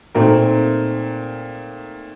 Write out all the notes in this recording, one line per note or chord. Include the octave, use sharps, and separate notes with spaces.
A#2 A3 C4 D#4 A#4